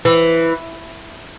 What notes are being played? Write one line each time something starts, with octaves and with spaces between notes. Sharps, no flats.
E3